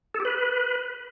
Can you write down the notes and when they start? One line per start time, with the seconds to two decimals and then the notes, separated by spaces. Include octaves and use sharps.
0.14 A4
0.20 G4
0.25 B4